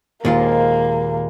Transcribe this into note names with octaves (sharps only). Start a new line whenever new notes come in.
D#2 A#2 G#3 A#3 F4 A#4 C5